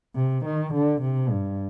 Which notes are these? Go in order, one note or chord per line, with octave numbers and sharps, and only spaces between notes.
C3
D#3
D3
C3
G2